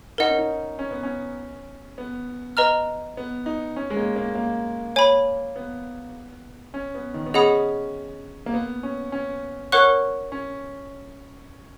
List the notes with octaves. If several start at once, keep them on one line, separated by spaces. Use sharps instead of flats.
D#4 A#4 D#5 F#5
C#4
D#4
C#4
B3
C#4
B3
B4 D#5 A#5 F6
B3
D#4
C#4
G#3
A#3
A#3
A#3
C#5 G#5 B5
B3
C#4
B3
D#3
B3
C#4 G#4 D#5 F#5 B5 D#6
A#3
B3
C#4
C#4
A#4 C#5 F#5 C#6 F#6
C#4